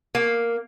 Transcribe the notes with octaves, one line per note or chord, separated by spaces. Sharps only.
A#3